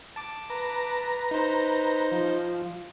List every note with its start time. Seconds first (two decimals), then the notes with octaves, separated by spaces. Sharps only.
0.16 A5 D6
0.50 B4 A#5
1.31 D#4 C5
2.12 F3